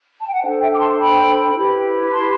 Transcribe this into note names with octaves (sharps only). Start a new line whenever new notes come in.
A5
G5
F#5
D4 A4 C5 E5
E5 G5
D6
A5 C6
G5 B5
E4 G4 B4
A5 C6